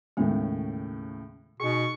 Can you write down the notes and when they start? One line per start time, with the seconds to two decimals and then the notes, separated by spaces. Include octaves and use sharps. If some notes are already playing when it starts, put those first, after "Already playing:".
0.17 D#2 A2 C#3 G#3 B3
1.60 B2 D#4 G#4 C#6